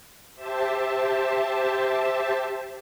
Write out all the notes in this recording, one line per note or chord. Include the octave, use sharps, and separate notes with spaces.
G4 C5 E5 A5